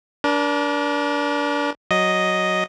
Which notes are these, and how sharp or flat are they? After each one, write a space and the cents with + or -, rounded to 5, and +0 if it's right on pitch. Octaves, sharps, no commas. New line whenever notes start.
D4 -20 A#4 +35
F#3 +0 D#5 +0